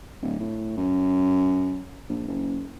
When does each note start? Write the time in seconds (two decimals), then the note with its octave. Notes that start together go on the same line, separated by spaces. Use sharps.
0.22 D1
0.40 A2
0.77 F#2
2.09 A#1
2.28 F#1